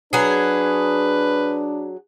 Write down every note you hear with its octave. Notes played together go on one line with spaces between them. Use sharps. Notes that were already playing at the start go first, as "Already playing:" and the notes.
F#3 D4 G#4 B4